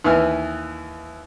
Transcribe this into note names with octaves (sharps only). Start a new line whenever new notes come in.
D#2 E3 F6